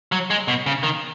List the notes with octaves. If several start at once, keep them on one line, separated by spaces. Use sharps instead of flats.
F#3
G#3
B2
C#3
D#3